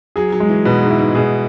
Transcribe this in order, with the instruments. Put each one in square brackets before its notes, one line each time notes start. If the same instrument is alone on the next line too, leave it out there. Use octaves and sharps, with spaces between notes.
[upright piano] F#3 [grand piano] G#4
[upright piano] F#3
[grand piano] G#3
[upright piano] E3
[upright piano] B2 [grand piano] B4
[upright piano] G#2
[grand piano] E4
[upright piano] G#2
[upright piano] B2 [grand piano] G#4